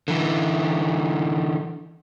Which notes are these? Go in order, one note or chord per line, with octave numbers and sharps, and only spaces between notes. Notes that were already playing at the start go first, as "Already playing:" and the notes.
D3 E3